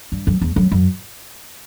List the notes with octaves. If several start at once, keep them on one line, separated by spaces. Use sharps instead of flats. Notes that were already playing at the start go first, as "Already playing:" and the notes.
G2
F#2
E2
F#2
F#2